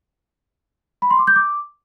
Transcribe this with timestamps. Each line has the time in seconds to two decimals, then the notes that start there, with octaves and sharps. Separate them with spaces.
1.02 B5
1.11 C6
1.19 D6
1.27 G6
1.36 D6